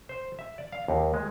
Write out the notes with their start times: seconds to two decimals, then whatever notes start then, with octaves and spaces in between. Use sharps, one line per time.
0.09 C5
0.39 E5
0.58 D5
0.72 F5
0.88 D#2
1.14 G#3